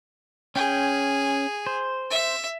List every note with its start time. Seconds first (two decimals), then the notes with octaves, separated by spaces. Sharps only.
0.56 C#4 G#4 G5
1.67 C5
2.11 E5